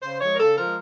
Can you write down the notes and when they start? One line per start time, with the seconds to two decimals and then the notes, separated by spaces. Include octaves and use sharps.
0.02 C#3 C5
0.20 F3 G#3 C#5
0.32 A#4
0.39 C#3 A4
0.57 F3 G#3 A#4